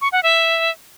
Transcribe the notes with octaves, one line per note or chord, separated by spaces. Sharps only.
C#6
F#5
E5